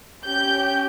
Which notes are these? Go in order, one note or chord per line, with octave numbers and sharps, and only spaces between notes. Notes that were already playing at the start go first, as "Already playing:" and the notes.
C#4 G4 G6